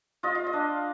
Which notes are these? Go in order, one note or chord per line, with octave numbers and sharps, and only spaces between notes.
F4 D#5
F5
D#5
D4